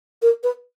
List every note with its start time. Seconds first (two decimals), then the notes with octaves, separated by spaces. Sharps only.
0.22 A#4
0.44 B4